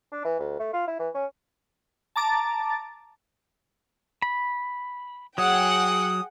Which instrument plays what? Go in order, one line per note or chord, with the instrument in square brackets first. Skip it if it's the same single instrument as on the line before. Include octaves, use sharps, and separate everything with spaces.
[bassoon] D4
E3
D2
A3
F4
E4
E3
C#4
[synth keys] A5 A#5 D6 A6
[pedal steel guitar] B5
[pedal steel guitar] F#3 [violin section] G#4 F#5 G5 [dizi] D#6